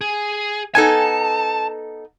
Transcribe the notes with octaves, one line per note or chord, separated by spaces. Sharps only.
G#4
B3 D#4 A4 G#5 A5